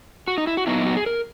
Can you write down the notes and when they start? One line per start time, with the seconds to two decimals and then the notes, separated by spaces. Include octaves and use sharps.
0.28 F#4
0.38 D#4
0.47 E4
0.57 F#4
0.67 A#2 F#3 B3 D#4 E4
0.77 E4
0.86 F#4
0.97 G#4
1.06 A#4